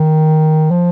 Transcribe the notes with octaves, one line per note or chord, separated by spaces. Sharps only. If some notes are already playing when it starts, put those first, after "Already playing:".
Already playing: D#3
F3